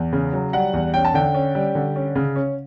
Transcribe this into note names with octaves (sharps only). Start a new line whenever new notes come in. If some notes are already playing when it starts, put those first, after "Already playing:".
Already playing: E2
C#3
F#3
G3 F#5
E2
C#4 G5
A5
D3 G5
C#4
G3
D3
C#4
C#3
C#4